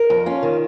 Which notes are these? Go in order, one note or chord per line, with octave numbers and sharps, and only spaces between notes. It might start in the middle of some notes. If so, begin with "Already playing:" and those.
Already playing: A#4
F2
C#4 F4
D#3